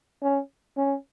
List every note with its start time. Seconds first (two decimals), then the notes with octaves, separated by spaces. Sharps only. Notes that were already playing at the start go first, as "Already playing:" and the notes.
0.22 C#4
0.77 C#4